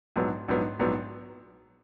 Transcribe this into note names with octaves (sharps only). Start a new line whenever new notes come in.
A#1 G#2 F#3 B3
A#1 G#2 F#3 B3
A#1 G#2 F#3 B3